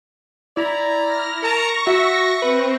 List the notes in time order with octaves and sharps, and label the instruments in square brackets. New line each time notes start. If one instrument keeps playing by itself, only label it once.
[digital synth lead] E4 [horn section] D5 A#5
[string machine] F6 A#6
[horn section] A#4 A5 A#5 [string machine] C#6 A#6
[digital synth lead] F#4 [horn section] E5
[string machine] C4 [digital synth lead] B4